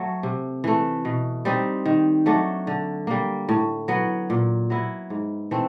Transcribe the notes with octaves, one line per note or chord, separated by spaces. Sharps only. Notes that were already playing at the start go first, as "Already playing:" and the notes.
Already playing: F#3 A3
C3
E3 A3
B2
G3 C4 D#4
D#3
F#3 A3 D4
D3
G3 A#3
A2
F#3 B3
A#2
F#3 B3 E4
G#2
E3 A3 C4